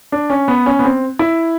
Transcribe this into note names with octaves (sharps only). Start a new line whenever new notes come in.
D4
C#4
B3
C#4
B3
C4
E4